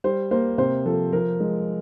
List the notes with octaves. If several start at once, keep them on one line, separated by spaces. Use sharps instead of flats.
G3 C5
A#3 C5
C3 C5
F3 A4
F3 A#4
G#3